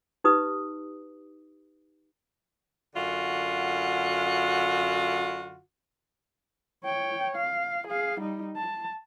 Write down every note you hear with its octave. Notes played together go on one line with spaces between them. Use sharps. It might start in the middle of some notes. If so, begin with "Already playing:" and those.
D#4 G4 B4 D#6
F#2 D3 F4 F#4
C#5 G5
F5
G#4 F5
G3 D#4
A5